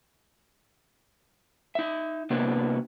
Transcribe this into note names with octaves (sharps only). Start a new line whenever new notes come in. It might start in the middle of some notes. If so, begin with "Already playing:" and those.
D#4 E5
C3 A#3 B3 D4 F#4